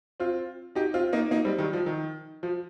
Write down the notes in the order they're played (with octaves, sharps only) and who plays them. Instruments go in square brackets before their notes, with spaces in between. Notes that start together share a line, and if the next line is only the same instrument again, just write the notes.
[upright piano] C4 F4
D#4 G4
C4 F4
A#3 D#4
A#3 D#4
G3 C4
D#3 G3
F3
D#3
F3